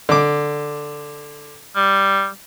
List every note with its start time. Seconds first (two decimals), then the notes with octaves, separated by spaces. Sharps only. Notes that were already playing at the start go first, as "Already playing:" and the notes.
0.09 D3 D6
1.76 G3